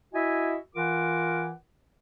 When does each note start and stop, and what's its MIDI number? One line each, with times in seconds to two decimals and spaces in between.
0.14 0.56 64
0.14 0.56 66
0.14 0.56 75
0.14 0.56 76
0.14 0.56 80
0.75 1.51 52
0.75 1.51 65
0.75 1.51 70
0.75 1.51 78
0.75 1.51 86